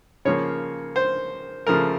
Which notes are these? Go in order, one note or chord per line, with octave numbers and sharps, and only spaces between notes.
C#3 F3 A#3 C#5
C5
C#3 F3 A3 A#4